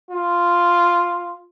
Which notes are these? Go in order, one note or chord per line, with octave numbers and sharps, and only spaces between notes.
F4